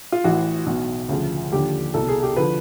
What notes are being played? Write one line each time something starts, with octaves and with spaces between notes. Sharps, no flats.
F4
A1 A2 E3 F#4
B1 B2
D2 C#3 F3
D#2 D3 F3 G4
C2 B2 A4
G#4
G4
D3 F3 B4